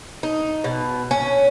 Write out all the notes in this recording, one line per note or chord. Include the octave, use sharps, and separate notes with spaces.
D#4
B2
C#4